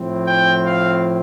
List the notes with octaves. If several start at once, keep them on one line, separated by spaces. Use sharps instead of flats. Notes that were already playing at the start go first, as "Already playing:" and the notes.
Already playing: A2 F3 C4
G5
F5